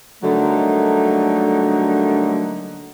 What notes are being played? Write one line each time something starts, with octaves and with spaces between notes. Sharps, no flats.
D3 F#3 G3 A3 A#3 D#4